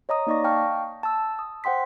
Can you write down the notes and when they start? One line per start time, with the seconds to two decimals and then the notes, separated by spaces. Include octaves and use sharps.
0.09 C#5 D#5 A#5 D#6
0.27 A#3 D#4 D5 D#5 C#6 A#6
0.44 F5 G5 A5 C#6 F6
1.03 A5 E6
1.39 D#6
1.64 C5 F#5 G5 C6 B6